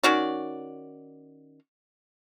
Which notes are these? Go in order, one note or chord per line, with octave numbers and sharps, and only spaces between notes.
D#3 C#4 F#4 D5